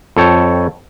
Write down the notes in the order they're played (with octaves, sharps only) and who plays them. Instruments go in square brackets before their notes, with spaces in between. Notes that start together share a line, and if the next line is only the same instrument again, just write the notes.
[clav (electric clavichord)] F2 A4 C#5 G5